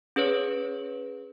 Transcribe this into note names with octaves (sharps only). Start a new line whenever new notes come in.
C#4 G#4 B4 C#5